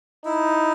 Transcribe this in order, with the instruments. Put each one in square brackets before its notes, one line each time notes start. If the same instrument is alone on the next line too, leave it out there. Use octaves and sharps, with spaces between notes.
[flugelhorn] D#4 [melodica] E4